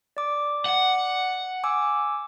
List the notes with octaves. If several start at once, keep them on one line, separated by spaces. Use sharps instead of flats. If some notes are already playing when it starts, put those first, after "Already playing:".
D5 D6
F#5
G#5 D6 E6